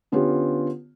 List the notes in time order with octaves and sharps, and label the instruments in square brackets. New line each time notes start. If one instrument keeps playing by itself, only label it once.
[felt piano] D3 B3 C#4 F4 G4